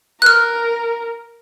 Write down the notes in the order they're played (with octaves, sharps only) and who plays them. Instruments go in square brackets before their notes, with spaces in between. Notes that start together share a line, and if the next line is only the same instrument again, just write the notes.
[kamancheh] A#4 [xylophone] F6 F#6